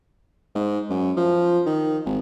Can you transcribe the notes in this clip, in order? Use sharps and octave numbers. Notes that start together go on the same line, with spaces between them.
G#2
F#2
F3
D#3
G#1